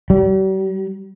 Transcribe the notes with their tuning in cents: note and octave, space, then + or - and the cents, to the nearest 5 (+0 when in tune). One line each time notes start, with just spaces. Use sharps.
G3 -45